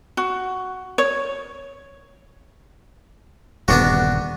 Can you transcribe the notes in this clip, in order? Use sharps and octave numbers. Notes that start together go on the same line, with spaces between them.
F#4
C#5
D#1 G2 D3 B3 D4 F#4